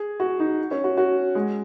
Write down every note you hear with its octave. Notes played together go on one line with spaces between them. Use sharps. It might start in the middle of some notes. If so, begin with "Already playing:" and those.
Already playing: G#4
F#4
D#4
C#4
F#4
F#4
G#3